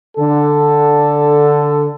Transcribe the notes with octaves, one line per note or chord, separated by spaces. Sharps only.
D3 A4